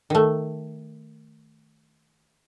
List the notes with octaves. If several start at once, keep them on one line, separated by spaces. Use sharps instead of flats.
D#3 A3